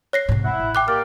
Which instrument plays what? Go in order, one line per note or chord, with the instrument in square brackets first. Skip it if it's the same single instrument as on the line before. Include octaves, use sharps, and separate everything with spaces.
[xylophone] C#5 A#6 C7
[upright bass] G#2 C3
[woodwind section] E4 F#5
[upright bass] A1
[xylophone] G5 D6 F#6
[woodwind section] A#3 G4 D5 [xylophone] F6